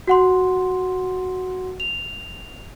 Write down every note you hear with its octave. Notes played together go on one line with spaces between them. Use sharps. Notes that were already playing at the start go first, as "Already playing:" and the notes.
F#4 F#5 C6
F7